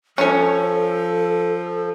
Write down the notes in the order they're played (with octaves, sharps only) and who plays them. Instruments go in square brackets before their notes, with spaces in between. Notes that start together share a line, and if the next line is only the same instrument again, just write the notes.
[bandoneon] F3 [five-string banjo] C#4 C#5 [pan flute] A4